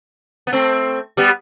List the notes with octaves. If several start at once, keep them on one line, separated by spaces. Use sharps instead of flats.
B3
A3 C4
G3 B3